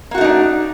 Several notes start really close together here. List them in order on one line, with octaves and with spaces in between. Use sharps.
A#3 F#4 A3 D#4 D4